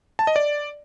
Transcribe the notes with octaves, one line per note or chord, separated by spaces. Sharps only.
A5
D#5
D5